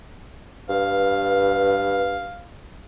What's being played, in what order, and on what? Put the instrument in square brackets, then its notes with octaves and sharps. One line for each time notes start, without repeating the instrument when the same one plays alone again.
[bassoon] G2 [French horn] B4 [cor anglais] F5